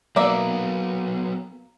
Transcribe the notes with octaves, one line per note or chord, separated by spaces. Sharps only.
F#3 A#3 B3 D5 E5